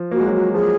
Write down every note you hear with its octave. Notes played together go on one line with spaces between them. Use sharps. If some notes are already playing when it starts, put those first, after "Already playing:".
Already playing: F3
A#3 F#4
G#3
F#3
F#4
F3 G#4